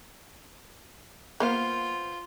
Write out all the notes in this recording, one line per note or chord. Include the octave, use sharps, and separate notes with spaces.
A#3 B3 F4 C5 F5